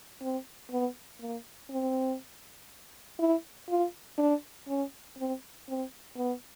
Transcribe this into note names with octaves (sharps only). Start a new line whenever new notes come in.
C4
B3
A#3
C4
E4
F4
D4
C#4
C4
C4
B3